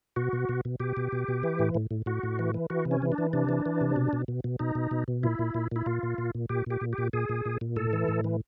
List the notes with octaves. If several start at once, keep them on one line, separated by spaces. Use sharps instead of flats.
B2 F#4
B2
B2
B2
B2 G4
B2
B2
B2
E3
A2
A2
A2
A2 F#4
A2
E3
E3
E3 F#4
C3
C#4
E3
D4
E3
C3 D4
E3
E3
C3
B2
B2
B2
B2
B2 D#4
B2
B2
B2
A#2 E4
A#2
A#2
A#2 E4
A#2 F4
A#2
A#2
A#2
A#2 G4
A#2 G4
A#2
G4
A#2
A#2 G#4
A#2
A#2
A#2
A2 A4
E3
A2
E3